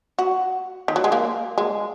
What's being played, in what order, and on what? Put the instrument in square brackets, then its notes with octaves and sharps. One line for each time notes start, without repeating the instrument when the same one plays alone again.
[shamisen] F#4
D#3
F#3
G#3
A#3
G#3